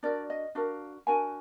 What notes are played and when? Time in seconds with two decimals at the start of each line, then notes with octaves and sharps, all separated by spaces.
0.03 D4 F#4 A#4 D5
0.30 D#5
0.55 D4 F#4 A#4 F5
1.07 D4 F#4 A#4 G#5